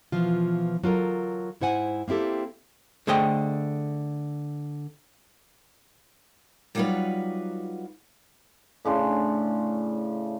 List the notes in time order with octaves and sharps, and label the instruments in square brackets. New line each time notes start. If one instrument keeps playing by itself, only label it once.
[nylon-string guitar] B2 E3 F3 F4
F#3 F4 A4 A#4
G#2 E4 C5 F#5 G#5
A#3 C4 E4 G4 A4
[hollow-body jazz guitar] D3 A3 G#4 C5 D#5 G5
[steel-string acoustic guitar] F#3 G3 D#4 F4 F#4 B4
[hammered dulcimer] A2 C#3 D4 C6